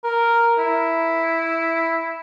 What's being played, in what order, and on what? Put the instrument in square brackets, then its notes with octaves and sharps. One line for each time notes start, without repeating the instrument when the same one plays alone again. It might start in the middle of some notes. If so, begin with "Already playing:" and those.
[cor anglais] A#4
E4